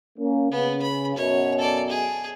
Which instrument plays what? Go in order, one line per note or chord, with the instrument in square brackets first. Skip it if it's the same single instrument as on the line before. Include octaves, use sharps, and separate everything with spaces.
[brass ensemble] A#3 C#4
[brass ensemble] C#3 [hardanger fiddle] B3
[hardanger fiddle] B5
[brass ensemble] F#2 B2 [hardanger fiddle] C#5
[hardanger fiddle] A4 D5
G#4